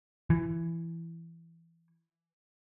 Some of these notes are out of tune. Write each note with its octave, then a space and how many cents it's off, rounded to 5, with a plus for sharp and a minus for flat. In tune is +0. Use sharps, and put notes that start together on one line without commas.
E3 +15